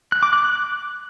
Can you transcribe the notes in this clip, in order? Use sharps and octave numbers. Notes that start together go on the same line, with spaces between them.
F#6
D6
F#6
F#6